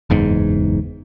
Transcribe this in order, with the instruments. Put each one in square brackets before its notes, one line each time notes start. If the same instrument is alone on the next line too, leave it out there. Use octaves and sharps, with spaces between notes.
[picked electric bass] F#1 E2 G#2